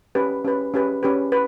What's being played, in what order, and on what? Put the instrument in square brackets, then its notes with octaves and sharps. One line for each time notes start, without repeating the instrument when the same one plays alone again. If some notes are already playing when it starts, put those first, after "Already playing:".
[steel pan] C#4 G4 B4
C#4 G4 B4
C#4 G4 B4
C#4 G4 B4
B4